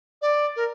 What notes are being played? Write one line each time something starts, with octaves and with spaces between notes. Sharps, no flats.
D5
A#4